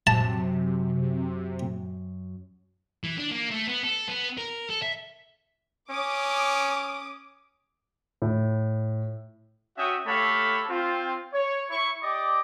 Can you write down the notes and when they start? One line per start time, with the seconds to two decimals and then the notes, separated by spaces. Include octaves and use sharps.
0.07 F#2 C3 A5
3.04 E3
3.18 D4
3.31 A#3
3.51 A3
3.67 B3
3.84 A4
4.08 B3
4.38 A#4
4.69 A4
4.82 E5
5.90 C#4 D6 D#6
8.22 A2
9.77 C#4 F#4 E5 G5 D#6
10.06 A3 G4 A4 C#5 F5 B5
10.69 C4 F4
11.33 C#5
11.70 E4 C#6
12.02 G4 D5 D#5 D6